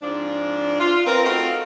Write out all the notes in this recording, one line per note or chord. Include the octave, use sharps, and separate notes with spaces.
G#2 F3 C4 D4
F4
C4 A#4 B4
A3 C4 D#4 F4 F#4 A#4